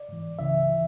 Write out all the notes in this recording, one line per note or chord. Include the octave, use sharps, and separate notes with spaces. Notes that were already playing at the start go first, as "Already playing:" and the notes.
Already playing: D5
G#2 E3
C#2 C#3 E3 E5
E3